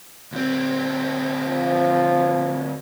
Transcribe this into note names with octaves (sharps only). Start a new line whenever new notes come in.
D2 C4
F3